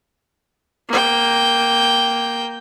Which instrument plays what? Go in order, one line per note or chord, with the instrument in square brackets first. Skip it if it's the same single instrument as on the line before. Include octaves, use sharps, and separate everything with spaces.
[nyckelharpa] A#3 G5